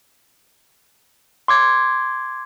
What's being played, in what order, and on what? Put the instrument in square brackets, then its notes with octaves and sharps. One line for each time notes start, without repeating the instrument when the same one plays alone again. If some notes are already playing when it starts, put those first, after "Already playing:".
[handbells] C6 D6 G#6